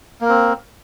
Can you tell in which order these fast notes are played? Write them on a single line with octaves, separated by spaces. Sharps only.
A#3 A#4 C4